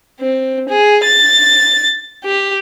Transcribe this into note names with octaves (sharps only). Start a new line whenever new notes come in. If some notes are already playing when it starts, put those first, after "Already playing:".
C4
G#4
A6
G4